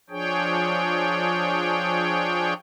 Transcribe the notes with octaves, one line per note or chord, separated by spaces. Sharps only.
F3 D4 G#4 C#5 G5